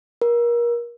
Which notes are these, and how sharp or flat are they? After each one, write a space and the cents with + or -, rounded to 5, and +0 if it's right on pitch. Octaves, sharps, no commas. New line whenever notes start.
A#4 +30